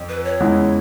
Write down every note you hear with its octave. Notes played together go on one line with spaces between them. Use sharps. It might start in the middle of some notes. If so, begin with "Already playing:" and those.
Already playing: F2
B4
C#5
E2 C#3 E3 G#3